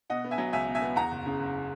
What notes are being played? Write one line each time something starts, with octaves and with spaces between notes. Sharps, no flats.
B2 D#5 F#5
B3
E5 G#5
F#3
C#2 E5 G#5
B2
E5 G#5
B3
E2 F#5 A#5
F#1
C#3
F#1